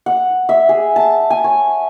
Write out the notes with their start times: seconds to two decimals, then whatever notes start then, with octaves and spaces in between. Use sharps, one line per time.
0.06 F#5
0.49 E5
0.69 G#4
0.96 A5
1.30 G#5
1.44 C#5